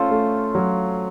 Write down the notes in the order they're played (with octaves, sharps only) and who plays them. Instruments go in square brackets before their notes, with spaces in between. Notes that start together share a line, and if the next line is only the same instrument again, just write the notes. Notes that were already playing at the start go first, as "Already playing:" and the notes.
Already playing: [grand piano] A3 C#4 [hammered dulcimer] F4 A4 C5
[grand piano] A3
F#3